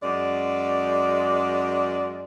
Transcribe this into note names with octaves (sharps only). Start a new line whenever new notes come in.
F#2 G#3 D5